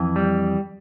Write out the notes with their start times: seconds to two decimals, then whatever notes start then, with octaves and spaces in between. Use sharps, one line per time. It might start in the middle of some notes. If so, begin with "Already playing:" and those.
Already playing: F2 E3
0.16 G3